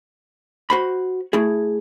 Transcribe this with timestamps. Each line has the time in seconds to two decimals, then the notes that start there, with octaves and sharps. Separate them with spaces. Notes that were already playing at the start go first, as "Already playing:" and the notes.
0.70 F#4 C5 B5
1.33 A3 E4 G#4